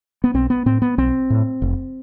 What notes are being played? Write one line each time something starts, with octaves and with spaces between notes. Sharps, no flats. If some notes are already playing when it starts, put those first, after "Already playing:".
B3
B1 C4
B3
A2 C4
B3
B1 C4
A2
F1